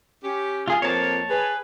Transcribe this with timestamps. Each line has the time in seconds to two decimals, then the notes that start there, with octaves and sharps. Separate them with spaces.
0.23 C#4 G4
0.68 F4 G#4
0.82 F2 F3 A#3 C#5 A5
1.29 G#4 B4